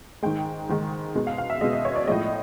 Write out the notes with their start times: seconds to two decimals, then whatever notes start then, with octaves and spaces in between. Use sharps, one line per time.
0.23 G#2 D#3 G#3 G5
0.69 G#2 D#3 G#3
1.15 B2 G#3
1.27 F5
1.38 F5
1.50 E5
1.61 B2 G#3 D#5
1.73 D#5
1.85 C#5
1.96 D5
2.07 A2 F3 G#3 D#5